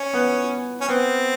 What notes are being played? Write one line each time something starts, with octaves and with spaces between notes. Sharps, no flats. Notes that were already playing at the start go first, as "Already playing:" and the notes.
Already playing: C#4
B3
C#4
B3 C4